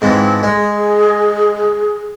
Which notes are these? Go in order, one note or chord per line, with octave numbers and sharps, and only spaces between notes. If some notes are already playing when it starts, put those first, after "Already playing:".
G#2 E3 F3 C4
G#3 G#4